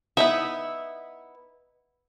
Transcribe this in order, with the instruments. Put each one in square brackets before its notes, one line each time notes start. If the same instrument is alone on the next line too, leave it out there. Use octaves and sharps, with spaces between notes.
[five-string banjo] B3 D#4 E4 [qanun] E5